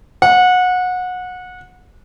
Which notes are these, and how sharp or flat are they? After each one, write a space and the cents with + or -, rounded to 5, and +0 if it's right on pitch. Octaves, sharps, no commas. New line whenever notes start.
F#5 -25